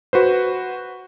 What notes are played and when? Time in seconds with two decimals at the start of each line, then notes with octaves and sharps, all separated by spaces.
0.13 F#4 B4 C5